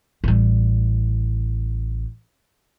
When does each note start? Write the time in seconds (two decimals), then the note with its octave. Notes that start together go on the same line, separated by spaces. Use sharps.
0.24 A1 G3